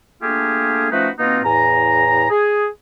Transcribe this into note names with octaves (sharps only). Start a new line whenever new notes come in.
A3 A#3 D4 F4 G4 G#4
F3 A3 C#4 D#4 F#4 B4
B2 A#3 C4 D#4 F4 F#4
E2 A2 G#5 A#5
G#4